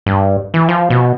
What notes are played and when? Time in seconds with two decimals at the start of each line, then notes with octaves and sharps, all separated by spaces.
0.06 G2
0.54 E3
0.69 F3
0.90 B2